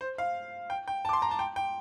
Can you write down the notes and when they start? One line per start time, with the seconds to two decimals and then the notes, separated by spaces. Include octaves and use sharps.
0.01 C5
0.18 F5
0.70 G5
0.88 G5
1.05 A5
1.09 D6
1.13 C6
1.22 A#5
1.31 A5
1.39 G5
1.56 G5